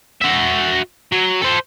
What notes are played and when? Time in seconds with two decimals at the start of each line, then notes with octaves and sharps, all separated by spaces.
0.21 F#4 E5
1.12 F#3
1.42 A4 C5